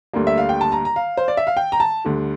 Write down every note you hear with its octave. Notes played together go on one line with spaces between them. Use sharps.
D2 D3 G3 A#3
E5
F5
G5
A5
A#5
A#5
F5
C5
D5
E5
F5
G5
A#5
A5
D2 D3 G3